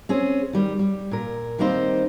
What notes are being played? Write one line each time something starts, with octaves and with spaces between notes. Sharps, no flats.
C4 C#4 G#4
D#3 G3
G3
A#2 A#4
D#3 G3 A#3 C4 D#4 C5